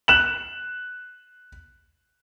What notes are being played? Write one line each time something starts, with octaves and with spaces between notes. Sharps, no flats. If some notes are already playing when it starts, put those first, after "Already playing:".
F#6 E7 F#7